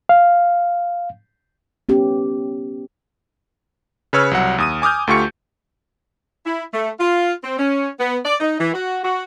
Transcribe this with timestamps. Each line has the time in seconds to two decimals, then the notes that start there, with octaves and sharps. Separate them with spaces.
0.09 F5
1.89 B3 C#4 G4
4.13 C#3 B4 C#5 E6 F6
4.31 C2 F#3 F#5
4.58 D#2 D#6 D#7
4.82 G#5 D6 D#6 F6 G6
5.07 D2 A3 F4 G4 C#6 C#7
6.46 E4
6.74 A3
7.00 F4
7.44 C4
7.58 C#4
7.99 B3
8.25 D5
8.40 D#4
8.59 E3
8.74 F#4
9.04 F#4